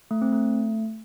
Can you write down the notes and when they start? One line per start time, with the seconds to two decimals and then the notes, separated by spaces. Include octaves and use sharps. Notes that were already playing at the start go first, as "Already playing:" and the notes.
0.11 A3
0.22 C4
0.32 A3